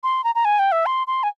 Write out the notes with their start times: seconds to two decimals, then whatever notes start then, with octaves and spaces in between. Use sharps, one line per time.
0.03 C6
0.24 A#5
0.35 A#5
0.45 G#5
0.59 G5
0.72 E5
0.86 C6
1.07 C6
1.23 G#5